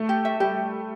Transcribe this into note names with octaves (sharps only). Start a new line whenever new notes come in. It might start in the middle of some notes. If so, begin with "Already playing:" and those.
Already playing: A3
G4
E5
G3 G4